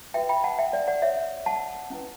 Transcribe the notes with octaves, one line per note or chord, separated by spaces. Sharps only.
F#4 B4 E5 G5
G5 B5
F#5 A5
E5 G5
D5
D5 F#5
C#5 E5
F#5 A5
C#4 E4 B4